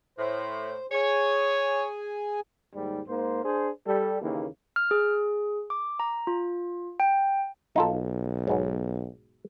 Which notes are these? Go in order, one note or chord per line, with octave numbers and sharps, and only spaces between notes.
A2 C5
G#4 C#5 G#5
D#2 G#2 G3
G#2 A#3 C5
D4 G#4 C5
G3 A4
D#2 C#3 E3 A#3
F6
G#4
D6
A#5
F4
G5
B1 D#4 F4 A4
G#2 B2 F#3